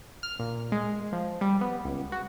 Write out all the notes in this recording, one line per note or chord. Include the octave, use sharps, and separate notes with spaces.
F6
A#2
G#3
F3
G3
B3
C#2
F#4